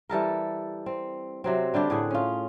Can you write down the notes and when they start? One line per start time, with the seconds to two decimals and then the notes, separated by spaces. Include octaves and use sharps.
0.09 E3 G3 A4 A#4
0.86 C4
1.44 C3 F#3 C4
1.74 D3 G3 D4 G4
1.90 A2 D3 G#4 F#5
2.11 C#4 F4